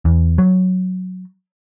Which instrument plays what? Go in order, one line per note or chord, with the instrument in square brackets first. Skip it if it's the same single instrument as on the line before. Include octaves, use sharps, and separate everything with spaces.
[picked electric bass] E2
F#3